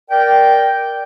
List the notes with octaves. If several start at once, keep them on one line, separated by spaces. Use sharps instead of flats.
A#4 D5 G5